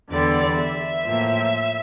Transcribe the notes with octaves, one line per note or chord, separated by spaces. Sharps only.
E2 D3 G3 D5
E5
A2 F3 A#3